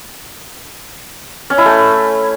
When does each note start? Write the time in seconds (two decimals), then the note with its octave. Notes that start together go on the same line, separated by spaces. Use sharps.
1.50 C#4
1.58 E4
1.66 A3